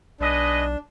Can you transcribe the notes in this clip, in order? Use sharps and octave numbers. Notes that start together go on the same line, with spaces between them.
B1 D4 G#4 B4 D#5